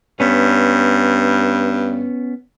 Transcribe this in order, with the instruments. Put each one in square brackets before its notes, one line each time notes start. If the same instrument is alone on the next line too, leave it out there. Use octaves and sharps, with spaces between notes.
[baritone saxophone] G2 [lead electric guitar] B3 C#4